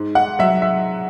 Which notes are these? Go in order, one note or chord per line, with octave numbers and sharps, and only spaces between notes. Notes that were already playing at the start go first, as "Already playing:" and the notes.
Already playing: G#2
F#5
F#3 E5
E5